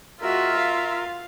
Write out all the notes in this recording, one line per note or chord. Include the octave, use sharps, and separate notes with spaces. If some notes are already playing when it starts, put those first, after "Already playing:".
G#3 F4 F#4 A#4 E5
F5